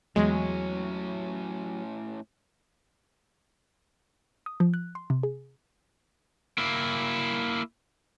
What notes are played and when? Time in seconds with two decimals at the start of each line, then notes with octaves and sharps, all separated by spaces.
0.16 E2 A2 F#3 G#3 C#4
4.46 D#6
4.60 F3
4.74 F#6
4.95 C6
5.10 C3
5.23 G#4
6.58 A#3 E4